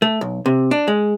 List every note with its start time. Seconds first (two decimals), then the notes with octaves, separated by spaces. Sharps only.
0.02 A3
0.21 B1
0.46 C3
0.71 D4
0.88 G#3